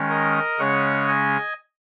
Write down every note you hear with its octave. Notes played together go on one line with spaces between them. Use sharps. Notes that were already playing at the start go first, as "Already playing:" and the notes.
Already playing: D#3 G#3 C#4
A#4 D#5
C#3 G#3 C#4 C#5 F#5
D#5 G#5